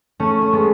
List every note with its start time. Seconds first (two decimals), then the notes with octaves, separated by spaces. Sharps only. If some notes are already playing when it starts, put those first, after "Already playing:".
0.20 A3 C#4
0.42 C#4
0.53 G#3 B3